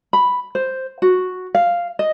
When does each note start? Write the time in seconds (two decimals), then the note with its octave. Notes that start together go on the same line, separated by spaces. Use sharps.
0.13 B5
0.55 C5
1.02 F#4
1.55 F5
1.99 D#5